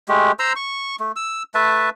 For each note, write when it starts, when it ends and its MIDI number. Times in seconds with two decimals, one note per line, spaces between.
0.09 0.32 56
0.09 0.32 57
0.09 0.32 67
0.39 0.53 72
0.39 0.53 82
0.39 0.53 84
0.39 0.53 88
0.56 0.96 85
1.00 1.12 57
1.16 1.43 88
1.55 1.90 57
1.55 1.90 71
1.55 1.90 76
1.55 1.90 81